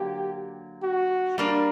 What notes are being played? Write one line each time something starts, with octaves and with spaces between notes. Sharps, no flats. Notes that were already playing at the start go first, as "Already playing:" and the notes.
Already playing: D3 F#3 A#3 G4
F#4
G3 A#3 D4 A#4